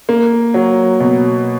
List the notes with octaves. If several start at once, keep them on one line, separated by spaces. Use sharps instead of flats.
A#3
F#3
B2